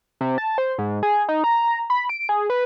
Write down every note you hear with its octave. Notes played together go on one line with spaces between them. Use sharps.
C3
A5
C5
G#2
G#4
D#4
A#5
B5
D7
G#4
B4